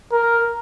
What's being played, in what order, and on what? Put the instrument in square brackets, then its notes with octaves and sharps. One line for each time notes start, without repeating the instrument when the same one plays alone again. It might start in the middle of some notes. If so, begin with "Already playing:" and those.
[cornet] A#4